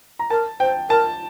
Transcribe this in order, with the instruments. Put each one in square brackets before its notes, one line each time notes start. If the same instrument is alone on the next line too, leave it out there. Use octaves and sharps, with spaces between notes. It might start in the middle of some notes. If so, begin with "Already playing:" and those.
[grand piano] A#5
[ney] A#4 [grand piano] A5
[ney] C5 [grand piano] G5
[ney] A#4 [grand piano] A5